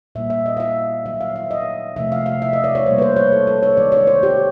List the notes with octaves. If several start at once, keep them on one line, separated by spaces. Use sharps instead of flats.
A#2 G3 A#3 E5
E5
D#5
F5
E5
D#3 F#3 A#3 E5
F5
E5
D#5
C3 F3 A3 E5
F5
F5
E5
D#5
D5
C#5
B2 G3 A#3 C5
B4
C5
C#5
A4
A4
C#5
D#3 G#3 D5
C#5
C5
G4